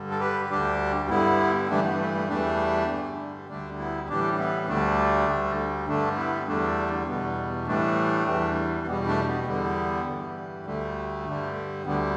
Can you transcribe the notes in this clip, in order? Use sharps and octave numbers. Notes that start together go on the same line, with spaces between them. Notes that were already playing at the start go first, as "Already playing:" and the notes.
Already playing: G2 D3 G3
A4
G4 B4
D2 D3 G3 D4 G4
G2 D3 G3 B3 E4
G2 E3 G3 A3 D4
B3
A3
A3
E2 E3 G3 A3 D4
G2 D3 G3
D2 D3 G3 A3 D4
B3 E4
A2 E3 G3 D4 G4
B3 E4
D2 D3 G3 A3 D4
D2 D3 G3
G2 D3 G3 A3 D4
B3 E4
E2 D3 G3 A3 D4
E2 B2 G3 B3
A2 E3 G3 A3 D4
E2 E3 G3
E2 B2 G3 B3
A3 D4
B3
E2 D3 G3 B3
G2 E3 G3
D2 D3 G3 A3
G2 D3 G3
D2 D3 G3 B3